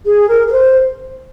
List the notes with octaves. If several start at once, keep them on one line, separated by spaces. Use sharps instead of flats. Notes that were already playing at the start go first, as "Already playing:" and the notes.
G#4
A#4
A#4
C5